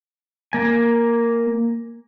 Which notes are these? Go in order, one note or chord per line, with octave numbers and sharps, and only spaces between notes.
A#3 G#5